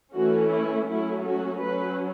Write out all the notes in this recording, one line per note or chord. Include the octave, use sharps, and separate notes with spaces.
E3 A3 C#4 F#4
E4
F#3 A3 C#4 E4
F#4
F#3 C#4 B4